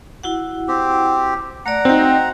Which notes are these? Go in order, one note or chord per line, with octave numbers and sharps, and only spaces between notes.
E4 F#4 F#5
C4 G4
A3 D5 F#5 A#5
C4 D#4 F#4 G5